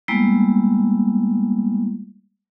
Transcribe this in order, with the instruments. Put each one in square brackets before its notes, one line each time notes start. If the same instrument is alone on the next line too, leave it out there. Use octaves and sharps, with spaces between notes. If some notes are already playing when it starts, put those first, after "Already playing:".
[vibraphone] G3 G#3 A#3 B3 E4